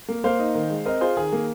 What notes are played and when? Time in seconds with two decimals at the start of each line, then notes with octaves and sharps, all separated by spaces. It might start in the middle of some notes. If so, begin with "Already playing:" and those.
0.08 A#3
0.24 A#3 C5 F5
0.39 D#4
0.55 D#3
0.70 G#3
0.85 C4 A#4 D#5
1.01 F4 G#4 C5
1.17 D#3 G#4
1.33 A#3